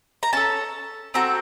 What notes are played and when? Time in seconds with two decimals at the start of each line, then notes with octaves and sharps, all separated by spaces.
0.23 A#5
0.33 C#4 A4 A5
1.14 C4 F#4 A4 A#5